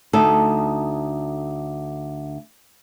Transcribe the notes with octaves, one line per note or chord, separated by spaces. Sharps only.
D2 D#4 A4